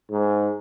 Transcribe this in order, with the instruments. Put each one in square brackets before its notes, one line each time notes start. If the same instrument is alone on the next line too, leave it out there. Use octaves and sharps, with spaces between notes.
[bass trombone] G#2